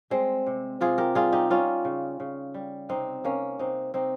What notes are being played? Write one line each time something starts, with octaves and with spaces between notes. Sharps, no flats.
G3 G#3 C4
C3
C3 F4 G#4
G4 A#4
G3 F4 G#4
D#4 G4
G3 C#4 F4
C#3
C#3
G3
C3 C4 D#4
C3 A#3 C#4
C3 C4 D#4
C3 C4 D#4